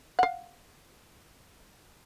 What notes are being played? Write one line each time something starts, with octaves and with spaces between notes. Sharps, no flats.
F5 F#5